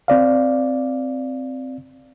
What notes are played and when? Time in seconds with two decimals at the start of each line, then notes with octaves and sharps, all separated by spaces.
0.08 C4 D5 F5